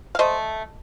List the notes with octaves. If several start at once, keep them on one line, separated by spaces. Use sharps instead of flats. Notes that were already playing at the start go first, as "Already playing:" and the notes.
F5
A3 C5 D#5